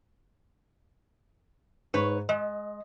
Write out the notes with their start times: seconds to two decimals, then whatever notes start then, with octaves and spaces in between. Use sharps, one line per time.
1.94 G#2 B4 C#5
2.29 G#3 D#5